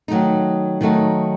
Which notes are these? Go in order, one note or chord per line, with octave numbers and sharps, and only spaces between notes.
D#3 F#3 A3 D#4
D#3 F#3 A3 D#4